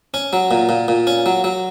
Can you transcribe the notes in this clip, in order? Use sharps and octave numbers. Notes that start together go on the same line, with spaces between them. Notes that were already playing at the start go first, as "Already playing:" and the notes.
C#4
F#3
A#2
A#2
A#2
C#4
F#3
F#3